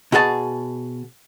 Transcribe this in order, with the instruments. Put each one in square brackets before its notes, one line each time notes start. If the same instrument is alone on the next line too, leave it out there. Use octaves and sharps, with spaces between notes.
[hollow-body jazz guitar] B2 F#4 G#4 E5 A5